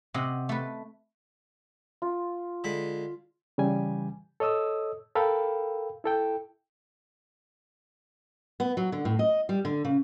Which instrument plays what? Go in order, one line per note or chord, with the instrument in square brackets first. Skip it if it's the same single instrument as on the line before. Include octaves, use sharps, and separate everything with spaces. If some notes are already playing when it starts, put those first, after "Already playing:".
[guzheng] C3 D#5 F#5
A3 B4
[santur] F4
[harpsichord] D3 G#3 B5
[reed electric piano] C#3 E3 G3 G#5
A4 C#5 D#5 D#6 E6
A4 A#4 F5 G5 B5
E4 A4 G5
[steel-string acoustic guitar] B3
F#3
D3
A2
D#5
G3
D3
C#3